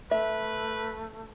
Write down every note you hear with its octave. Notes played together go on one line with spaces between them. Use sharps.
A3 B4 E5